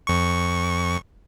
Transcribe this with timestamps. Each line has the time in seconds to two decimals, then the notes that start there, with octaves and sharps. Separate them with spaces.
0.07 F2 C#6